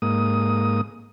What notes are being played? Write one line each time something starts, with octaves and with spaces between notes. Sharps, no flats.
G#2 A#3 D#6